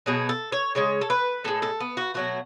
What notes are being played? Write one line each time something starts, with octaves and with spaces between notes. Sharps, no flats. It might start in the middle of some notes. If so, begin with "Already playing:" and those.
B2 F#3 A3 G#4
A4
C#5
C#3 G#3 C#5
A4
B4
A2 G#3 A4
A4
B3
F#4
B2 F#3 A3 F#4